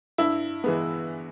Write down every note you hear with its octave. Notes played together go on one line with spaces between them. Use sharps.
G2 E4
E3 G#3 B3